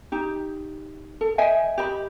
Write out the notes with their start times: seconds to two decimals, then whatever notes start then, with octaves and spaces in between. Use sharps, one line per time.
0.12 D#4 G4
1.21 A4
1.38 D#5 E5 G5 G#5
1.78 G4 D#5 B5